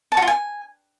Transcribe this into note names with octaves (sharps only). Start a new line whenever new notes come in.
A5
F#4
F4
G#5